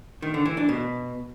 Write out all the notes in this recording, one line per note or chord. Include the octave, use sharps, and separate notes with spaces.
D#3
D3
E3
D4
B2